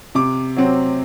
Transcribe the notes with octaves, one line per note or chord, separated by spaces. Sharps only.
C3 D6
F#3 C4